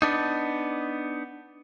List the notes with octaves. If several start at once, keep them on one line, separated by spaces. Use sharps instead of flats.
B3 D4 D#4